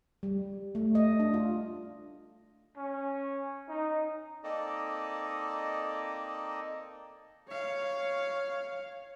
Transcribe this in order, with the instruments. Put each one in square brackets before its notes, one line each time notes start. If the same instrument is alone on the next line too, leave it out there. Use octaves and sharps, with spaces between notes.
[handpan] G3
A3
D#5
D4
F4
[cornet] C#4
D#4
[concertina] A#3 C4 D#4 A4 D5 D#5
[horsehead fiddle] C#5 F5